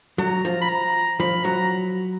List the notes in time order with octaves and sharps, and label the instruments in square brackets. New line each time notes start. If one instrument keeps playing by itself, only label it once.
[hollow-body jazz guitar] F#3 [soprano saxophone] A#5
[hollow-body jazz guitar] F3
[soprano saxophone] B5
A#5
[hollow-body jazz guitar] F3 [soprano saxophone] B5
[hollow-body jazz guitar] F#3 [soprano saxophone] A#5